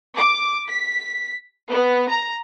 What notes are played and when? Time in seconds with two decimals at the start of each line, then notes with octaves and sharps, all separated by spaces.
0.15 D6
0.68 B6
1.70 B3
2.09 A#5